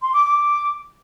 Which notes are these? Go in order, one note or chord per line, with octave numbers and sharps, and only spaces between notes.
C6
D6
D6